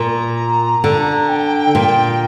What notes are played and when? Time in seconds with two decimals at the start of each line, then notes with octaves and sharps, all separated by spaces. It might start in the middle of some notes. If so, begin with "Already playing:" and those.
Already playing: A#2 A#5
0.84 D3
1.29 G5
1.75 A#2